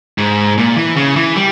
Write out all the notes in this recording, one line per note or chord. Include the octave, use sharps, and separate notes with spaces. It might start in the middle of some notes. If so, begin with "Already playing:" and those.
G#2
A#2
E3
C#3
E3
G3